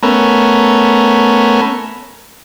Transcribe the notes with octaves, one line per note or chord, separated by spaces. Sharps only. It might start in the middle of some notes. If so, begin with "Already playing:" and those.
A3 B3 C#4 A#4